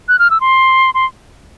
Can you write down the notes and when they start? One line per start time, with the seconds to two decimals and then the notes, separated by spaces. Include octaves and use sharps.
0.09 F#6
0.19 F6
0.30 E6
0.41 C6
0.95 C6